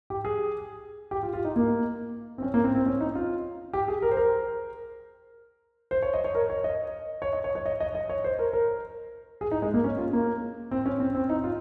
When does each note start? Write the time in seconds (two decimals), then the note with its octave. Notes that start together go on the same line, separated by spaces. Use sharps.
0.10 G4
0.25 G#4
1.11 G4
1.23 F4
1.33 F4
1.45 D#4
1.56 A#3
2.38 C4
2.42 C#4
2.54 A#3
2.64 C4
2.75 C4
2.86 C#4
3.01 D#4
3.15 F4
3.73 G4
3.88 G#4
4.02 A#4
4.11 C5
4.17 A#4
5.91 C5
6.02 C#5
6.14 D#5
6.24 C#5
6.35 A#4
6.50 C#5
6.64 D#5
7.22 C#5
7.33 D#5
7.44 C#5
7.55 C#5
7.66 D#5
7.80 D#5
7.95 D#5
8.09 C#5
8.24 C5
8.39 A#4
8.53 A#4
9.41 G#4
9.51 D#4
9.62 G#3
9.74 A#3
9.84 C#4
9.98 F4
10.13 A#3
10.71 C4
10.86 C#4
11.00 C4
11.15 C4
11.29 D#4
11.44 F4